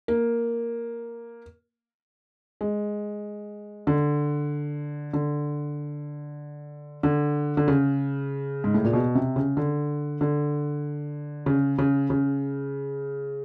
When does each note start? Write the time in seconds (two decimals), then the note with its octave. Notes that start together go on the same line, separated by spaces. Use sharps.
0.08 A#3
2.61 G#3
3.87 D3
5.13 D3
7.03 D3
7.57 D3
7.68 C#3
8.64 G#2
8.74 A2
8.85 A#2
8.93 B2
9.15 C3
9.36 C#3
9.57 D3
10.21 D3
11.46 C#3
11.78 C#3
12.10 C#3